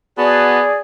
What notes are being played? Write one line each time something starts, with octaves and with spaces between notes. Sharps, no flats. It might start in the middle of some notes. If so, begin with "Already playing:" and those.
B3 F#4 G#4 D5 A5